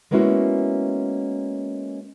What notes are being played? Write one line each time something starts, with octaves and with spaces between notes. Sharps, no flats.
G#3 A#3 B3 C#4 E4 F#4